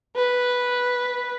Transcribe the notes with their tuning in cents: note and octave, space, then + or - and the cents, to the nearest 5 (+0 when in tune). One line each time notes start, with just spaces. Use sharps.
B4 -5